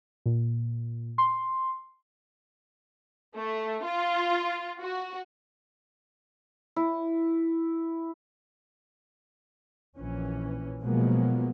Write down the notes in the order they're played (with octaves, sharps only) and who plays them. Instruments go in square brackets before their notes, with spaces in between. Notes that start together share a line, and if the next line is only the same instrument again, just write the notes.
[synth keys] A#2
C6
[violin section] A3
F4
F#4
[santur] E4
[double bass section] A#1 E3 C#4
B2 F3 F#3 G#3 A#3 B3